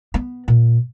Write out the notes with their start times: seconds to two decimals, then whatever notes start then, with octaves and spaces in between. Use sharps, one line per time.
0.14 B3
0.48 A#2